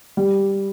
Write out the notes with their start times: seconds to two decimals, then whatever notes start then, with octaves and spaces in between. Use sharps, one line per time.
0.17 G3